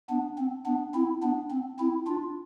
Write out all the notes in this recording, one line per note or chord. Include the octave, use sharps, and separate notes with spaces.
B3 D4
C4
B3 D4
C4 E4
B3 D4
C4
C4 E4
D4 F4